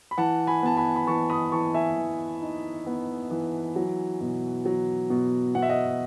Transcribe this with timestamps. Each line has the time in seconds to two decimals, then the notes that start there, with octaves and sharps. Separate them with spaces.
0.11 B5
0.18 E3 F#5 A5
0.47 G#5 B5
0.63 B3 A5
0.77 G#5 B5
0.96 B5
1.07 E3 A5 C#6
1.30 B5 D#6
1.52 E3 A5 C#6
1.74 E5 G#5
1.96 E3
2.41 D#4
2.87 B3
3.31 E3
3.76 F#3
4.21 B2
4.66 F#3
5.10 B2
5.55 B2 F#5
5.62 E5
5.69 D#5 F#5